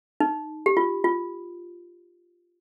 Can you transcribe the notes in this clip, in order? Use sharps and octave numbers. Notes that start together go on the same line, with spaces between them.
D#4
G4
F4
F4